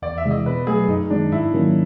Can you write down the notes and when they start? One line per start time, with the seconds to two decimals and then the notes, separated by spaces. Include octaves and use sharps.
0.02 E2 D5
0.18 E5
0.25 C3 E3 G#3
0.31 D#5
0.46 B2 B4
0.67 F#3 A3 G#4
0.88 F#2 D#4
1.10 D#3 G#3 D4
1.32 G#2 E4
1.53 D#3 F#3 A#3 C#4